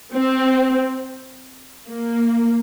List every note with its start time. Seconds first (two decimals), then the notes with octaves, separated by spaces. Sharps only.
0.12 C4
1.88 A#3